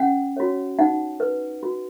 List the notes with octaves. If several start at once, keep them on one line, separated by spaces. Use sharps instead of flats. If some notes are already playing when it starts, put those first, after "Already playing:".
Already playing: C#4 F#5
F#4 C#5
D#4 F#5
B4
F#4